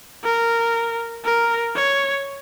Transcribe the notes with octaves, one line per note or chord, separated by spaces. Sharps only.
A#4
A#4
C#5